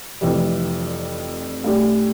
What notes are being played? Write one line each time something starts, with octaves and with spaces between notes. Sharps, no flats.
F1 F2 E3 G3
A2 G3 D4 G4